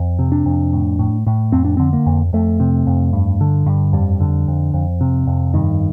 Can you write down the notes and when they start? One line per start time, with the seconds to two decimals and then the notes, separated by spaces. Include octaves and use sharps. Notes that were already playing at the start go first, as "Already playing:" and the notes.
Already playing: F2
0.19 C3
0.32 D4
0.46 F2
0.73 A2
0.99 A2
1.27 A2
1.52 F2 C4
1.65 D4
1.77 D3 C4
1.93 A#3
2.06 F2
2.33 F2 A3
2.60 C3
2.87 F2
3.13 G2
3.41 D3
3.66 G2
3.93 F2 G3
4.20 D3
4.48 F2
4.74 F2
5.01 C3
5.27 F2
5.54 G2 D#3